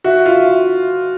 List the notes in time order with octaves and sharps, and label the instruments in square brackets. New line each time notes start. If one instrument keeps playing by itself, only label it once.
[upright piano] F#4 [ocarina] E5
[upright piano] F4